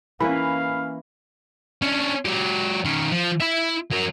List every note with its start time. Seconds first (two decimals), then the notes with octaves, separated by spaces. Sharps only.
0.20 E3 A#3 C#4 B4 F5 B5
1.82 C#4 D4
2.26 F#3 G4
2.85 D#3 C#4
3.12 F3
3.40 E4 E5
3.91 F#3 A#4